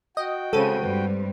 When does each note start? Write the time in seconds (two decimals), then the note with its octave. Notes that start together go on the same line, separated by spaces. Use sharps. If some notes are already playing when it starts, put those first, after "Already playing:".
0.17 F#4 D#5 G5
0.53 C#3 G#3 C4 A4 C5 D#7
0.83 G2 G3 B4